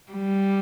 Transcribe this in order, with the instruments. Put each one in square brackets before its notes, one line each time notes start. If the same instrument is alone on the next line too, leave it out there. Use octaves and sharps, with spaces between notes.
[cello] G3